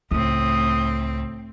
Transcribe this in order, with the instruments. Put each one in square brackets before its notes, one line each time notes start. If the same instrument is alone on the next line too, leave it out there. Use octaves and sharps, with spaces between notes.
[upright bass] C#2 [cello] A2 C4 [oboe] D#6